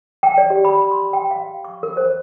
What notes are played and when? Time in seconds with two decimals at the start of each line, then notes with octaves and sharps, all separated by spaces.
0.23 G5
0.38 D5
0.50 G4
0.65 B5
0.91 C6
1.13 G5
1.31 F5
1.65 C#6
1.83 A#4
1.97 C5